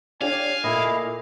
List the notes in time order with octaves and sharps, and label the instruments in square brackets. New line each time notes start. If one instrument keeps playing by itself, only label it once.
[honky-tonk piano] D4 G4 C#5 [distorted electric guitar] F5 [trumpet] G#5
[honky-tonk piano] A#2 A3 [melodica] E4 D#5